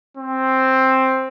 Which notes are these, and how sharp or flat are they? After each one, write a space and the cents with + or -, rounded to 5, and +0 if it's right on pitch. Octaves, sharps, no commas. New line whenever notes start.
C4 +5